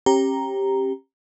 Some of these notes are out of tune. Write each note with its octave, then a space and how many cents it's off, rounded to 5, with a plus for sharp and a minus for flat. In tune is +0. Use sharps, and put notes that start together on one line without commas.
C#4 -40 G4 +0 A#5 +0